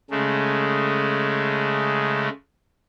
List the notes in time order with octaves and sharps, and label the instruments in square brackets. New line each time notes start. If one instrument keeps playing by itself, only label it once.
[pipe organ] C#3 G#3 A3